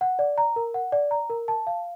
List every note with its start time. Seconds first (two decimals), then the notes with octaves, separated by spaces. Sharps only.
0.01 F#5
0.19 D5
0.38 A#5
0.56 A#4
0.74 F#5
0.92 D5
1.11 A#5
1.30 A#4
1.48 A5
1.67 F5